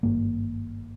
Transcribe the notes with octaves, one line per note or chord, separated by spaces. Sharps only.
G#1 G2 A#3